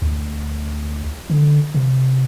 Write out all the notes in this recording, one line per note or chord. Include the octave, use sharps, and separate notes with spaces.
D2
D3
C3